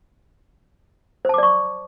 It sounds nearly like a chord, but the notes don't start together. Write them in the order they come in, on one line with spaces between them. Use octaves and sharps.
C5 A5 D6 D5 C#6